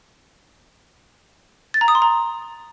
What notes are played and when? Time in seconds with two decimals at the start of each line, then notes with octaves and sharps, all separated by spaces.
1.74 A6
1.81 A#5
1.88 D#6
1.95 C6
2.02 A#5